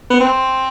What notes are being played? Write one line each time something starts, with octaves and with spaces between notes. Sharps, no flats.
B3
C4